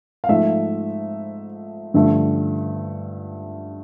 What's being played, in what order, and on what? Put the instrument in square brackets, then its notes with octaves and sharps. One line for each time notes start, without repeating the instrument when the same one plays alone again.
[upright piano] F5
G#2 F3 A3 E5
G2 D3 F3 A3 E5